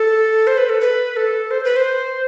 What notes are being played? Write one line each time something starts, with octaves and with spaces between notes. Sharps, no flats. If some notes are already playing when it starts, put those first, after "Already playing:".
Already playing: A4
C5
B4
A4
B4
A4
C5
B4
C5